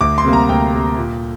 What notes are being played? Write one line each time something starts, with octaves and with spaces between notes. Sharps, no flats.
D2 D6
C6
C3 G3 A#3
A#5
D2 G5
C3 G3 A#3
A#2